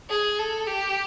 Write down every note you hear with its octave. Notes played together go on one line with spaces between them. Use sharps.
G#4
A4
G4